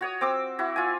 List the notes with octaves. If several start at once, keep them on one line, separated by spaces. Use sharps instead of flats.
F#4 C#5 D#6
C4 D6 E6
E4 F#4
F4 G#5